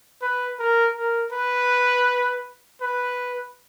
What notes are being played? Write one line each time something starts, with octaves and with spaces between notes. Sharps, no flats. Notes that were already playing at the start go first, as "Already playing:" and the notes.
B4
A#4
A#4
B4
B4